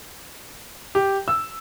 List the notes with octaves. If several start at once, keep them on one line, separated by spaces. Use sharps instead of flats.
G4
E6